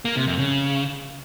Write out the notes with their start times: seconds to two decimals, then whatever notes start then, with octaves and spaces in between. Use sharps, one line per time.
0.05 A#3
0.16 C3
0.27 F2
0.38 C#3